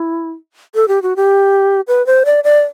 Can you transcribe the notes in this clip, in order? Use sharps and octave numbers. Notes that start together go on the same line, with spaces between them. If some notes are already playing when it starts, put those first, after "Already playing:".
Already playing: E4
A4
G4
F#4
G4
B4
C5
D5
D5